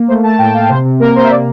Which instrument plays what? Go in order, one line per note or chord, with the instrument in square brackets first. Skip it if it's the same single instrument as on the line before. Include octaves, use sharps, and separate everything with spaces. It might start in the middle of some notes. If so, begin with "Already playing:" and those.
Already playing: [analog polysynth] A#3
A3 C5
A3 A5
A2 G5
A3 F5
C3 C5
C3
A#3 A#4
C3 C5
E5
A#3 D5